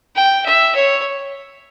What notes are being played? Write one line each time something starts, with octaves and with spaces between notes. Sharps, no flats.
G5
E5
C#5